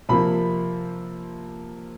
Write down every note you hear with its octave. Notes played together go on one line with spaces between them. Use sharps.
C3 F3 A#3 B5